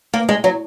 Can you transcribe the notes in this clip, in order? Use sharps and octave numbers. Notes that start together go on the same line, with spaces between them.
A#3
G#3
F#3